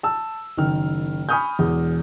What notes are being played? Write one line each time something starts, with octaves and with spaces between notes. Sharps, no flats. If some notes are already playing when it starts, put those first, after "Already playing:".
A5 E6
F#1 D#3 F6
G#5 B5 C#6 D#6 F6 G6
E1 E2